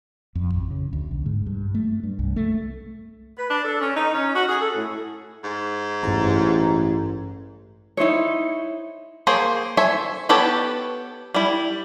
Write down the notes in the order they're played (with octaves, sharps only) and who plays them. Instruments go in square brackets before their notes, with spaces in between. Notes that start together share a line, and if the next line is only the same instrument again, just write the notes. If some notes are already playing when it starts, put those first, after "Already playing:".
[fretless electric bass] F2
A1
C#3
D2
B1
G#2
G2
A3
G2
C2
A3
[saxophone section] B4
D4
A4
C#4
D#4
C#4
F#4
G#4
A4
A2
[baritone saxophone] G#2
[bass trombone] A1 [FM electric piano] G2 A#5
[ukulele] D#4 E4 C5 C#5
[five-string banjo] A#3 G#4 C5 C#5
A4 C5 C#5 E5 G#5
B3 G4 A4 B4 C#5
G3 E4